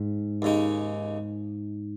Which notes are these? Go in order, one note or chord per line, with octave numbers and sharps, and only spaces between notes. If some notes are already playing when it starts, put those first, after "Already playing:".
Already playing: G#2
D#2 C#3 G#3 D#4